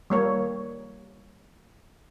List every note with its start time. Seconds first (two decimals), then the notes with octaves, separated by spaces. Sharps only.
0.10 G3 A#3 C#5